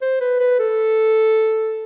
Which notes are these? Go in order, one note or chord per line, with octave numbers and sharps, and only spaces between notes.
C5
B4
B4
A4